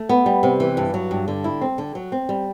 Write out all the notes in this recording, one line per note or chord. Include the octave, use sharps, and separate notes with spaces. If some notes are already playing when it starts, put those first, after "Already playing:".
Already playing: A3
B3
G3
C3
E3
G2
F#3
G2
D3
E4
C4
D3
F#3
C4
G3